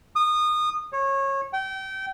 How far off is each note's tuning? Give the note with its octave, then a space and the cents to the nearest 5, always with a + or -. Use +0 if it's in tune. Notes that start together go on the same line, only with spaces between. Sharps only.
D#6 -25
C#5 -25
G5 -30